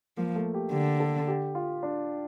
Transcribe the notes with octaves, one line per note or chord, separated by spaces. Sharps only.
F3 A#3
A3
G4
D3 G4
A4
G4
F4
D4